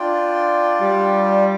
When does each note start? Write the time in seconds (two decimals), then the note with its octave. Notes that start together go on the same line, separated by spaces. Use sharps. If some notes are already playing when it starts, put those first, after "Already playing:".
Already playing: D4 F4 D5 G5
0.82 G3